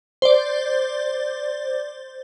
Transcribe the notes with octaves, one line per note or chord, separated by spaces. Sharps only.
C5 D5